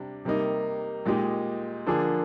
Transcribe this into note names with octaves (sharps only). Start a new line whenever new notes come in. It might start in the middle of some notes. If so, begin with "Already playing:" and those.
Already playing: C3 G3 D4
C3 G3 A#3 D#4
A#2 G#3 D#4 G4
D3 F3 A#3 D4 G#4